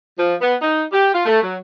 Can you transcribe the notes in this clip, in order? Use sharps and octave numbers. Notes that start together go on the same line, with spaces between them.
F3
B3
D#4
G4
F4
A3
F#3